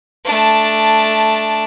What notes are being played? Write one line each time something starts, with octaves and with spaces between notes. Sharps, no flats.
A3 D4